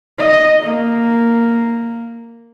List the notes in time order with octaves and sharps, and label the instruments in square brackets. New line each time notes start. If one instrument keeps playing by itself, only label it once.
[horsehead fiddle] D#5
A#3